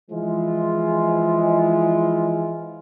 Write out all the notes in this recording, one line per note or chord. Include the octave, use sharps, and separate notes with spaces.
E3 F3 G#3 E4 F4